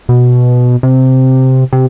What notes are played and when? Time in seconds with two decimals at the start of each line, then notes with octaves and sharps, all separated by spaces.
0.09 B2
0.83 C3
1.73 C3